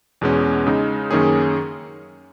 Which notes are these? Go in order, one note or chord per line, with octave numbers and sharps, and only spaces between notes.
E2 B2 G#3 C#4
C#3 G#3 D#4
F#2 D#3 A#3 C#4 G#4